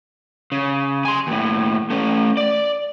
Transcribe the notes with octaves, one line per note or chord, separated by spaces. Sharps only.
C#3
G#5 C6
D#2 A2
A3 C#4
D5